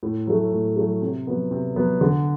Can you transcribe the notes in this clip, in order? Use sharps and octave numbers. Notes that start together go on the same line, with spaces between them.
A2
F#3 A3
A2
F#3 A3
C3
F#3 B3
C3
F#3 B3
D3